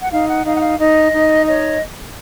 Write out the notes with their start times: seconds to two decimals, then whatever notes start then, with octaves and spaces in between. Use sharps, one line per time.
0.01 F#5
0.11 D#4 F5
0.28 F#5
0.45 D#4 F5
0.55 F#5
0.62 F5
0.78 D#4 D#5
1.11 D#4
1.46 C#5 D#5